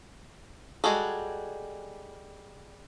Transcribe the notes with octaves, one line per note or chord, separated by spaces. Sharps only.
G3 G#3 F#4 G#4 A4